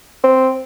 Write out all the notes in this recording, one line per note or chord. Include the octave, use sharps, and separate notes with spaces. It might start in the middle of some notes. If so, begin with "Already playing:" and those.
C4